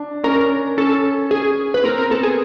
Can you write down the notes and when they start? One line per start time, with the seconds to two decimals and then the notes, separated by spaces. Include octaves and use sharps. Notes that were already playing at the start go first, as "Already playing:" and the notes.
Already playing: D4
0.24 C#4 A#4
0.77 C#4 A4
1.31 G#4
1.74 B4
1.84 C4 A#4
1.98 A#4
2.10 B3 A4
2.23 G#4